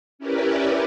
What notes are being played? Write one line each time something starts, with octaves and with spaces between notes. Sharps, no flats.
C#4 E4 G4 A#4 B4 D5